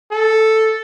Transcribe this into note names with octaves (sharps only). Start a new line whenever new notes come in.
A4